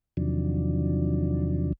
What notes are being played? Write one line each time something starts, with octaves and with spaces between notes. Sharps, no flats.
E2 C3 D#3 F3 F#3 D4